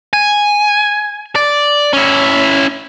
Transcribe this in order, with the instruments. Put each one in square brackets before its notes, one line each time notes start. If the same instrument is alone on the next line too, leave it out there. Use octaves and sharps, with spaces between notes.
[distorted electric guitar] G#5
D5
C#4 E4